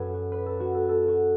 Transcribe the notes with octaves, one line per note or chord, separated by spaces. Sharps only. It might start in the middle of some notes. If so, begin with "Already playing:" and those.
Already playing: F#2 F#3 A4 B4
F#4
B4
A4
F#4
A4
A4
F#4